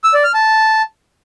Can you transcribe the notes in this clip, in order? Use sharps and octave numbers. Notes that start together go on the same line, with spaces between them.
E6
D5
F6
A5